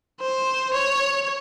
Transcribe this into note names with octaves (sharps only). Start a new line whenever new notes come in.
C5
C#5